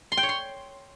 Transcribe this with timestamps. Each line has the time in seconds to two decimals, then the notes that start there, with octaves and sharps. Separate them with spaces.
0.12 C6
0.17 G5
0.23 C#5
0.29 C6